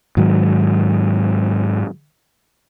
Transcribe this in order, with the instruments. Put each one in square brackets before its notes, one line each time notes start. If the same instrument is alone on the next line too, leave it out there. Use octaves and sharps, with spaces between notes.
[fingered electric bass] G#2 D#3 F#3